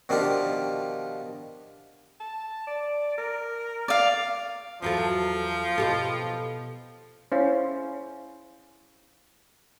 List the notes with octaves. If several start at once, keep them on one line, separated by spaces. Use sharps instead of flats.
B2 D#3 F3 D4 F4 G4
A5
D5
A#4
D5 F5
E2 F3 F#3 A4
B2 G4 A4
C#4 E4 C5 F5